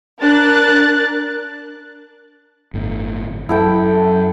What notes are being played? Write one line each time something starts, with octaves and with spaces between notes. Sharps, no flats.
D4 A#4 F#6 A6
G1 A2
F#2 E4 A4 G5